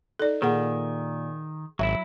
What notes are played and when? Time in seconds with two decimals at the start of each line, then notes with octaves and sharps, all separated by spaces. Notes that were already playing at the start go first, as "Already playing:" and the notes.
0.20 D#4 A4 D5
0.42 A#2 D#3 G#4 F#5
1.79 G#1 F#3 E4 E5